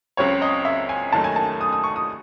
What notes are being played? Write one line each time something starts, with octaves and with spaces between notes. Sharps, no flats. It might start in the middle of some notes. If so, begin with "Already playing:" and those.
C#2 C#3 F#3 C4 C#5
D#5
E5
G#5
D#2 D#3 F#3 A3 D#4 A5
G#5
A5
D#6
D#6
C#6
D#6